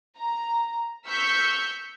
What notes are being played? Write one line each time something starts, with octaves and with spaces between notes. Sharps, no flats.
A#5
C#6 E6 F6 G6 B6 C#7